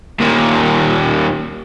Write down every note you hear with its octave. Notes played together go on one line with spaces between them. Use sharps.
D#2 A#2